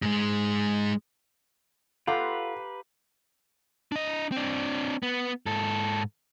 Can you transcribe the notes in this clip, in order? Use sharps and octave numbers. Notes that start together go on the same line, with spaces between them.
G#2 G#3
F4 G4 A4 B4 F5 F#5 A#5 C6
D4 D#5
C4 D4
B3
G#2 A4